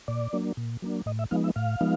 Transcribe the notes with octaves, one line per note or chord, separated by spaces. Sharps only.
A#2 D5
F#3 A#3 D4
A#2
F#3 A#3 D4
A2 D#5
E5
F3 G#3 B3 D#4 F5
E5
A2 F5
F3 G#3 B3 D#4